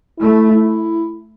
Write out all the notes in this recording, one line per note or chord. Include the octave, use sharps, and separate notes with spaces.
A3 E4
E4